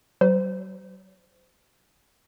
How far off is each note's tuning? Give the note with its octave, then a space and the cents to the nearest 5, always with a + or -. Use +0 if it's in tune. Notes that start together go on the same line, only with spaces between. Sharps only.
F#3 +45 C5 -30